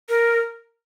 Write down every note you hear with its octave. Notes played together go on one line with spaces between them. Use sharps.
A#4